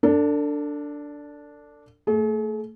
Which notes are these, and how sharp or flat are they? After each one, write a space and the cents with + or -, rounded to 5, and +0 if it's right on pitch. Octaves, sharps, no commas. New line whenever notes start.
D4 -5 A4 +35
A3 +25 G#4 +45